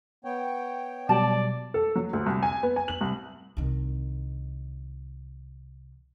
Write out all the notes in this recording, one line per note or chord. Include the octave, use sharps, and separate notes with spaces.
B3 C#5 G5
B2 F#3 G3 D5 A5
A4
F#3
D2
C2
G#5
B3
G#5
F#7
C2
C2 D#3